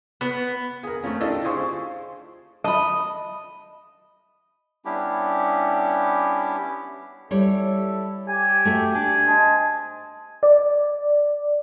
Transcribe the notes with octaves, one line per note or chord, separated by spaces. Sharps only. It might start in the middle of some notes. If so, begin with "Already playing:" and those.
B3
G#4 A#4
A3 C4 C#4 F4
D4 E4 F4 G4 A4 D#5
E4 F4 G#4 C5 C6 C#6
D#5 A5 B5
G3 B3 C#4 D4 E4 G4
G3 E4 A4 C#5
G4 G#5
A3 F#4 E5
D4 G#5
C5 D#5 A5
D5